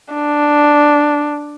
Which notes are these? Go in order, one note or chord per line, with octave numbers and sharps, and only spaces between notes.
D4